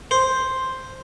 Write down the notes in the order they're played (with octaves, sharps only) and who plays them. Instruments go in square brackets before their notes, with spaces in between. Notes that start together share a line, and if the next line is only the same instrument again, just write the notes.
[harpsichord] C5